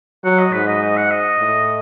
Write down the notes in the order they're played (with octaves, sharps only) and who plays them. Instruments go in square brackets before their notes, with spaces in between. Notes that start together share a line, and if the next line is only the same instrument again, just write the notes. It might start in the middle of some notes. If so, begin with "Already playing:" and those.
[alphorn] F#3 [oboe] F#5
[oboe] D#5
[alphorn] G#2 [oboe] B4
[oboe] D#5
D#5
F#5
D#5
[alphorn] A2